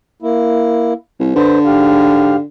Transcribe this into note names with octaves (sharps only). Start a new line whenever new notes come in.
A#3 E4
C2
D3 B4 C5
G#2 G4 F5